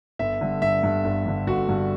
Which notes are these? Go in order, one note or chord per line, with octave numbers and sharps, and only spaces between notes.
G1 E5
G2 D3
G1 E5
G2 D3
G1
G2 D3
G1 F#4
G2 D3